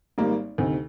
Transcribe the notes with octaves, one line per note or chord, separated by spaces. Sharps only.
G#1 G#2 G3 A#3
D2 C3 D#3